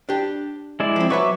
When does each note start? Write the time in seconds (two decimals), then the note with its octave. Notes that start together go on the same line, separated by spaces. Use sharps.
0.09 D4 G4
0.80 G#3 E4 D5
0.96 F3 C4
1.10 F#3 B4 C#5 E5 C#6 D6